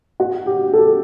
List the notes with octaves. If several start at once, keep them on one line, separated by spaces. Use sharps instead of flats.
F#4
G4
A4